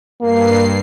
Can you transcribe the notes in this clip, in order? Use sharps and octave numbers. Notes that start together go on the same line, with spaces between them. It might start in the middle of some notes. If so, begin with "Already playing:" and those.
G2 A#3 C7